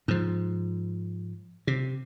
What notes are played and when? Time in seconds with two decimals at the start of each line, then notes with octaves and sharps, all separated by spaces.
0.08 G#2 F3
1.67 C3